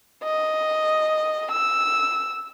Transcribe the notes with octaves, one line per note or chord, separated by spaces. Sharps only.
D#5
E6